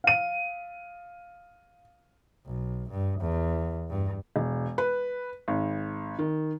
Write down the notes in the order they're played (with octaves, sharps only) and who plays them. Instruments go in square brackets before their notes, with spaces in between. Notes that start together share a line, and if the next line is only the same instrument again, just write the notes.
[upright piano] F5 D#7
[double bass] B1
G2
E2
G2
[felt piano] E1
B4
G#1
D#3